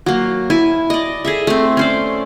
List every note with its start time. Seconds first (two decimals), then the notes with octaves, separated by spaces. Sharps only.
0.06 F#3 A#3
0.50 E4 G#5 A5
0.90 D5 D#5
1.25 G#4 A4 E5
1.47 A3 C4
1.77 C#4 C5 D5